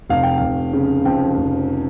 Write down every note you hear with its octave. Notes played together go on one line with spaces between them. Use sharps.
F1 F5
G5
F1 F5
C#3
F2 G5
F1